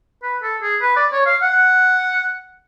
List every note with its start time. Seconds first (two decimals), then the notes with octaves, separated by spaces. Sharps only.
0.23 B4
0.43 A4
0.62 G#4
0.81 B4
0.96 D5
1.12 C#5
1.26 F5
1.42 F#5